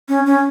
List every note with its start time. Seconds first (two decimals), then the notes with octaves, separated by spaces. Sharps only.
0.09 C#4
0.26 C#4